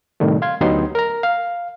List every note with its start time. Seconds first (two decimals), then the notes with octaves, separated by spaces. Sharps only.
0.20 A2 C3 D#3 G3 A3
0.42 F5 C6 G#6
0.61 D2 F#3 B3 D#4 G4 C6
0.95 A#4 A#5
1.23 F5